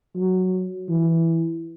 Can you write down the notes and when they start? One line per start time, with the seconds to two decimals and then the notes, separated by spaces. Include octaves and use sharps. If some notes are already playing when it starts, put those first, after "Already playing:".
0.16 F#3
0.89 E3